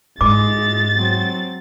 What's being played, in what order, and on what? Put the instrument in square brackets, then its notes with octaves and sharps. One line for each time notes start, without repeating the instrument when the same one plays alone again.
[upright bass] G#2 [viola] G#3 [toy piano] D6 [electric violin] A6
[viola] F#3 C4